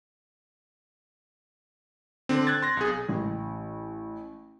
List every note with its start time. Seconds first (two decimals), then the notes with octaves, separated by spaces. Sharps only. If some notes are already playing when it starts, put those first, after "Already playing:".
2.29 D3 C4
2.47 F#6 G#6 A6
2.62 C6 A#6
2.77 B1 G#4
3.09 A1